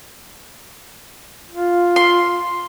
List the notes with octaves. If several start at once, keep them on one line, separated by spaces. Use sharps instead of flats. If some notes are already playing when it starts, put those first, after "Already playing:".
F4
C6